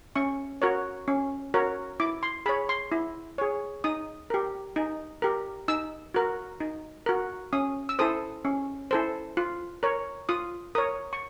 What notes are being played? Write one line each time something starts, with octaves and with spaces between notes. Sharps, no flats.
C#4 C#6
F#4 A#4 C#5
C#4
F#4 A#4 C#5
E4 D6
C6
G#4 C#5 B5
C6
E4
G#4 C#5
D#4 D#6
G4 A#4
D#4
G4 A#4
D#4 E6
F#4 A#4
D#4
F#4 A#4
C#4 D#6
E6
E4 A4 C5 D#6
C#4
E4 A4 C5
F4
A#4 C#5
F4 D#6
A#4 C#5 D#6
C#6